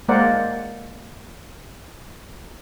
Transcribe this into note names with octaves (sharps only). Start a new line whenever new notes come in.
G#3 A#3 A#4 C5 D5 F#5